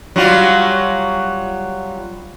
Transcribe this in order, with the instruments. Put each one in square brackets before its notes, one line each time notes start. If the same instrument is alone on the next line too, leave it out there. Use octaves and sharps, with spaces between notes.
[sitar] F#3 G3 F4